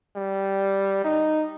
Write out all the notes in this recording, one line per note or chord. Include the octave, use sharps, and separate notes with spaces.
G3
D#4